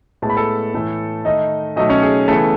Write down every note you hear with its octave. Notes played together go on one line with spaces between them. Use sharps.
A2 G#3 B3 A5
B5
A4 A5
A2 E3 A3
D#3 A3 D#4 D#5
B2 F#3 A3 D#4 D#5
C#4 C#5
G#4
C#3 E3 A3 B3 A4